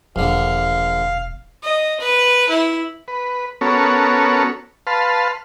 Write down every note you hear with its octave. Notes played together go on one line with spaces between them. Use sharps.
E1 A#1 D3 F5
D#5
B4
E4
B4
B3 C#4 F#4 A4 A#4 C#5
B4 F5 A5 C6